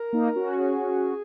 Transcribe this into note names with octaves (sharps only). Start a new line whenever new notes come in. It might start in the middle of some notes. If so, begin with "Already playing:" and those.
Already playing: A#4
A#3 D#4
C#4 F#4
G#4